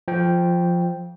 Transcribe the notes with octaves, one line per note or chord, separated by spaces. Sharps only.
F3 G5